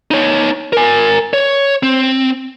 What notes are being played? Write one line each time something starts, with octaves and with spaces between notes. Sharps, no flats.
D#4 C#5
A#4 G#5
C#5
C4